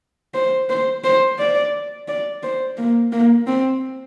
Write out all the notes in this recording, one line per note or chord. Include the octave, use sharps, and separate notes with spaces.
C5
C5
C5
D5
D5
C5
A#3
A#3
C4